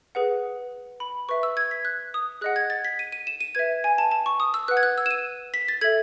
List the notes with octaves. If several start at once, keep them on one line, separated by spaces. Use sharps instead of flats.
G#4 B4 F#5
B5
B4 E5 C#6
E6
G#6
B6
F#6
D#6
G#4 D#5 F#5 F#6
G#6
A6
B6
D#7
D#7
E7
D#7
B4 E5 G#6
G#5
A5
A5
C#6
D#6
E6
B4 F#5 F#6
G#6
F#6
E6
E7
D#7
B6
A6
A4 E5 G#6